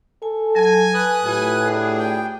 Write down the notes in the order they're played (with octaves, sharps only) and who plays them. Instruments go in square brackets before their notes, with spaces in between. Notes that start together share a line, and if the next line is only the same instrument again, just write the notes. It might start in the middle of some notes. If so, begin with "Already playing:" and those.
[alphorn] A4 [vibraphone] G#5
[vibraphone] F#3 [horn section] G#5
[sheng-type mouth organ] B4 D#6 F#6
[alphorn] A2 [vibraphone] A3 F4 G4 [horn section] G#5
[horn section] B3 D4 G#4
[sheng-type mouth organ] G5